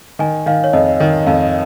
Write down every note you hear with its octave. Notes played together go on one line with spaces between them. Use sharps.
D#3 G#5
D#3 F5
C#5
F2 D#5
D#3 D#5
F2 F5